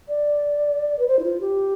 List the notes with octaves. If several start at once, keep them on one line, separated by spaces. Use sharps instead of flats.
D5
B4
C5
E4
F4
G4